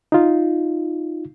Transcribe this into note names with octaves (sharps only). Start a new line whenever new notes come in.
D#4 F4